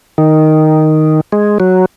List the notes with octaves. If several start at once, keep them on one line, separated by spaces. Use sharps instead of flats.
D#3
G#3
F#3